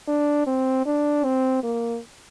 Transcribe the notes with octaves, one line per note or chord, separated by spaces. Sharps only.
D4
C4
D4
C4
A#3